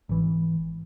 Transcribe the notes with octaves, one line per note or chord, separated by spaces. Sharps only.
G#1 E3